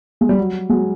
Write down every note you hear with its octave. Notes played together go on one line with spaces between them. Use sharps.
G#3
G3
F#3
F#3 G#3